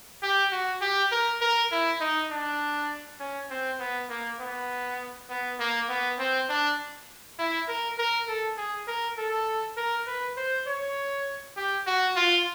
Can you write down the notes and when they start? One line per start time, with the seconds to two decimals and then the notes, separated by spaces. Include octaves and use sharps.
0.22 G4
0.52 F#4
0.81 G4
1.12 A#4
1.41 A#4
1.72 E4
2.00 D#4
2.31 D4
3.20 C#4
3.50 C4
3.80 B3
4.09 A#3
4.40 B3
5.29 B3
5.59 A#3
5.89 B3
6.19 C4
6.49 D4
7.39 E4
7.68 A#4
7.98 A#4
8.28 A4
8.57 G#4
8.87 A#4
9.18 A4
9.77 A#4
10.07 B4
10.37 C5
10.67 C#5
11.56 G4
11.87 F#4
12.16 F4